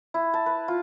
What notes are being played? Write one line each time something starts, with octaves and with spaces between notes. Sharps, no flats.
E4
A5
B4
F4